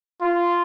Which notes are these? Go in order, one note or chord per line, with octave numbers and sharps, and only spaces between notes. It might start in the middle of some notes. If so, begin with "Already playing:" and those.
F4